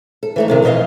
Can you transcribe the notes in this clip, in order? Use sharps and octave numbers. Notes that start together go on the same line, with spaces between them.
A4
E3 A3 D#4
F2 C3 D#3
F2 B2 E3 D#5 F5